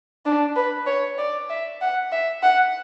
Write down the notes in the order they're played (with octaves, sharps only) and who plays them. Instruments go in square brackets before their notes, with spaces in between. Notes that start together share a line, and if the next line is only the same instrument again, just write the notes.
[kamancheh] D4
B4
C#5
D5
E5
F#5
E5
F#5